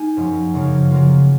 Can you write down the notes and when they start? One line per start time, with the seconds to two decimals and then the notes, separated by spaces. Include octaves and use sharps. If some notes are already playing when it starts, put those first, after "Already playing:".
Already playing: A#3 D#4 G#5
0.17 F#2 F3 G#3 C#4
0.54 F#2 C#3 F3 A#3 C#4
0.91 C#3 F#3 A#3 F4